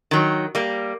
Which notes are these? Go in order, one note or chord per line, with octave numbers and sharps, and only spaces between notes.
D#3 F#3
G3 A#3